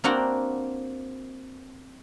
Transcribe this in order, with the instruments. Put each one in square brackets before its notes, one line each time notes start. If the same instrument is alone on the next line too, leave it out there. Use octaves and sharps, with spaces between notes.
[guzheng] A#3 C4 D4 F#4 F#5